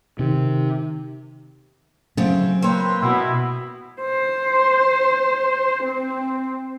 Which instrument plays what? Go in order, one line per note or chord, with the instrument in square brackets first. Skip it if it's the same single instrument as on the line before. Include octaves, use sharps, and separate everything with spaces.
[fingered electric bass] C3 [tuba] D#3
[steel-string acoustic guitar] C#3 A3 C4 [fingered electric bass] F#3 C#4
[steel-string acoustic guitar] A#3 C#5 [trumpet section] C4 B4 C6
[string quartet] B2 [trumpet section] E4
[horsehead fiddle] C5
C4